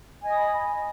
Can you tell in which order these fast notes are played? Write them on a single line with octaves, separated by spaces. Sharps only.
G#5 D#5 D#6 B5